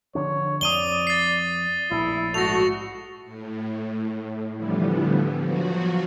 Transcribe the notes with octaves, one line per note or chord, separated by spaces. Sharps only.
D3 F3 D4 C#5
F2 D5 D#6 D#7 G7
A6 C7
A#1 A2 E4
G#2 A3 F#4 A#6 F7
A2
A2 D3 E3 F3 G3 B3
F3 F#3 F#4